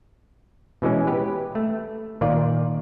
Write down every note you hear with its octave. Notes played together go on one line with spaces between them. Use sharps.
B2 E3 G#3 C#4
G4 B4
A3
A#2 D#3 F4 D5